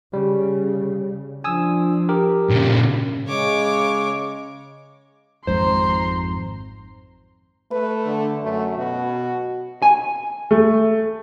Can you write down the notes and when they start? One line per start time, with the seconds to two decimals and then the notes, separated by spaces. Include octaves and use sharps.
0.13 C#3 G3
1.44 F3 D4 G#5 D#6 E6
2.09 G4 A#4
2.49 A#2 C#3
3.27 C#3 G#3 C#5 D6
5.47 G#1 F2 G#2 C5 A#5 C6
7.71 A3 B4
8.06 D3
8.43 F#2 A3
8.77 B2 F#4
9.82 G#5
10.51 A3